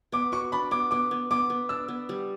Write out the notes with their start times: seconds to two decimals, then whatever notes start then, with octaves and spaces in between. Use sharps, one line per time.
0.12 B3 D6
0.32 F#4 C#6
0.52 D4 B5
0.71 B3 D6
0.91 B3 D6
1.11 B3
1.31 B3 D6
1.50 B3
1.69 D4 E6
1.88 B3
2.09 G3